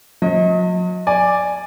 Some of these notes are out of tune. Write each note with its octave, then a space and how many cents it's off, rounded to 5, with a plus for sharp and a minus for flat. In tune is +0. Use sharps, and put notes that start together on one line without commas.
F#3 -45 D#5 +30
D5 +0 G#5 -5